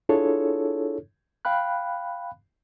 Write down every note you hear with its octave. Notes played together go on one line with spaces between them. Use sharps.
D4 E4 F4 G#4 A4 C#5
F5 G5 B5 F#6